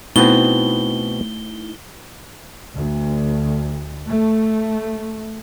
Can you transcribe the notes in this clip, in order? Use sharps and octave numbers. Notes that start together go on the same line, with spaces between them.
B2 A3 B3 C4 D#4 E4 G7
D2
A3